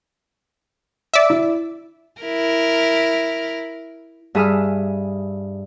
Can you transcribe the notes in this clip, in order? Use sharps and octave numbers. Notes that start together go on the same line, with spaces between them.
D5 E5
E4
E4 A#4
G2 G#4 E5 D#6 F6